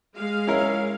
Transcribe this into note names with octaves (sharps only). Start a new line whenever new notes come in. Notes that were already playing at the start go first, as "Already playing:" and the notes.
G#3 F5
C#4 E4 A#4